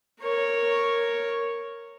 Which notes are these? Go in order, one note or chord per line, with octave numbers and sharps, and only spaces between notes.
A#4 C#5